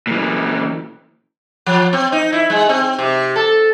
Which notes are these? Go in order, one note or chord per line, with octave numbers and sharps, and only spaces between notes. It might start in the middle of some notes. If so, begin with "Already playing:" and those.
A#2 E3
F3
C4
D#4
E4
G#3
C4
C3
A4